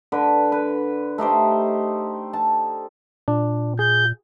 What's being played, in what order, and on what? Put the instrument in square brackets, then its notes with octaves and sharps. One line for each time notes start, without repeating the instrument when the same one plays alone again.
[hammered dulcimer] D3 B4
B4
A3 D#4 G4 C5
A5
[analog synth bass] A#2 [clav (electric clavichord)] D4
[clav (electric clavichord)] G#4 [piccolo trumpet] G6